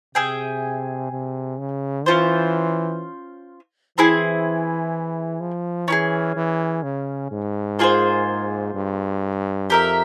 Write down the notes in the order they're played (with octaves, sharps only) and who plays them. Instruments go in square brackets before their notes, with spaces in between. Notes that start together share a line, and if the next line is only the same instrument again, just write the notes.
[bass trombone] C3 [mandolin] G#4 E5 G5
[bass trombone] C3
C#3
[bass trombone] E3 [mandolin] C#4 F4 C5
[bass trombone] E3 [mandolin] C4 E4 G#4
[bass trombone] F3
[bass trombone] E3 [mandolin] C#4 E4 G#4
[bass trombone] E3
C#3
G#2
[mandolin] A#3 F4 G#4 C5
[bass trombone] G2
[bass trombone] F2 [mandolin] G4 A#4 E5